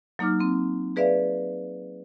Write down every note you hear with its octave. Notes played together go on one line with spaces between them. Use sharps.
F#3 A#3 D#4 D6 F6
A#3 C4
G#4 B4 D5 E5 F5